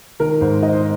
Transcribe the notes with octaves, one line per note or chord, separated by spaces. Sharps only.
D#3 A#4
G#2 C5
D#4 D#5
C5